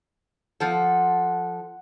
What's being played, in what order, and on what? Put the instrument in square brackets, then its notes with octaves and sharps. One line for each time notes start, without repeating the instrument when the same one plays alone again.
[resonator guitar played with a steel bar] F3 A4 [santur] F#5 C6